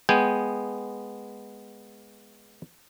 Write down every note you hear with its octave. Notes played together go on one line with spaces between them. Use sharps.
G#3 B3 G5 G#5